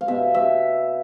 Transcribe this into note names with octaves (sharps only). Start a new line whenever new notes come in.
F5
B2 E5
E5